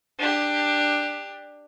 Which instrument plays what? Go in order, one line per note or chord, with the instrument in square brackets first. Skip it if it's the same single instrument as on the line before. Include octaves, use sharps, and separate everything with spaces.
[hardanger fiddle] D4 G4